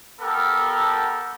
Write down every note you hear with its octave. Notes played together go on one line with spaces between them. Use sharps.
B3 G4 A4 A#4